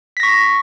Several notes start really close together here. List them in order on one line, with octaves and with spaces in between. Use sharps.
B6 A#6 C#6